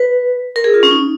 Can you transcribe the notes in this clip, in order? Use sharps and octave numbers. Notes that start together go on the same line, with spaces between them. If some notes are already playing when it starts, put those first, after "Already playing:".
Already playing: B4
A#4
G#4
F4
C#4
D#4